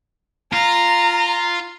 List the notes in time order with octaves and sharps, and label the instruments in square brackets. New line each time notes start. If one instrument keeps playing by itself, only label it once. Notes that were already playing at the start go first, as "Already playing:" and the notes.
[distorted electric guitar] F4 [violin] A#5